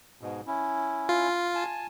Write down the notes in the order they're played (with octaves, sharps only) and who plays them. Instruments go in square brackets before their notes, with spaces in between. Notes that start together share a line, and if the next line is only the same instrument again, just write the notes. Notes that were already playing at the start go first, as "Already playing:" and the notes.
[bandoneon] G#2 B2
C#4 E4
[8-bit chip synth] F4
[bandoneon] G#5 A5